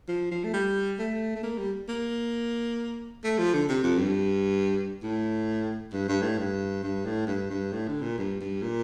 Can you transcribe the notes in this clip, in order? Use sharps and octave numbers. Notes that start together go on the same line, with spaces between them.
F3
F3
A3
G3
A3
A3
A#3
G3
A#3
A3
F3
D3
C3
F2
G2
A2
G2
G2
A2
G2
G2
A2
G2
G2
A2
D3
A#2
G2
G2
A#2